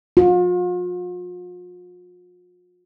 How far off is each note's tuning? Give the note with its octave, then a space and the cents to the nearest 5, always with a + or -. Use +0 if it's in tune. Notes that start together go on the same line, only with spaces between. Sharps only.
F4 +40